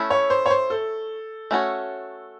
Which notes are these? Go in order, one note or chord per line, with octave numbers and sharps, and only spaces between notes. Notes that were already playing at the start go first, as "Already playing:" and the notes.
Already playing: A3 C#4 E4
C#5
C5
C#5
C5
A4
A3 C#4 F#4 C#5